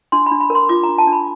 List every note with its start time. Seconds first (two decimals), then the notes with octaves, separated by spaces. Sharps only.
0.12 D4 C6
0.26 B5
0.31 D4
0.41 B5
0.50 A#4
0.55 C6
0.69 F4 D6
0.83 A#5
0.89 D4
0.98 A5
1.07 D4
1.12 B5